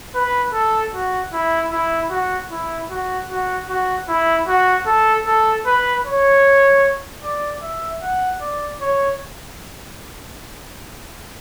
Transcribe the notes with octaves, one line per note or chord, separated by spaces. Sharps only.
B4
A4
F#4
E4
E4
F#4
E4
F#4
F#4
F#4
E4
F#4
A4
A4
B4
C#5
D5
E5
F#5
D5
C#5